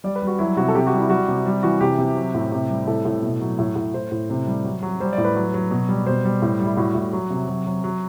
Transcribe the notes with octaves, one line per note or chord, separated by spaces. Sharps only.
G3 D5
B4
G3
F#4
F#3 E4
C3 F#4
A4
C3 G4
F#4
G3
E4
G3 F#4
C3
G3
E3 F#4
C3 G4
C3
F#3
A2
C3
G3
A2 A4
A2
B2
F#3
A2
A2
A2 C5
A2
C3
G3
F#3
F#3
G3 C5
D5
A2
B4
F#3
F#3
B2
G3
B2 C5
G3
A2
G3
E4
A2 F#4
A2
F#3
C3
F#3
F#3
F#3